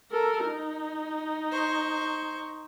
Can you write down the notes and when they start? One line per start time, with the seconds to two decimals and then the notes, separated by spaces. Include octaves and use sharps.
0.12 A4 A#4
0.46 D#4
1.52 C5 C#6